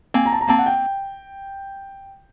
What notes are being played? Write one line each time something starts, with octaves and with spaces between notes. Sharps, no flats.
A#3 C4 G#5
A#5
A5
A#5
A#3 C4 A5
F#5
G5